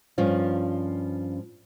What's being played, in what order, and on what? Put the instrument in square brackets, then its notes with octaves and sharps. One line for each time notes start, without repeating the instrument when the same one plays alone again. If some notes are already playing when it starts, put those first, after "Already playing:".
[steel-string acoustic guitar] G2 F3 C#4 F4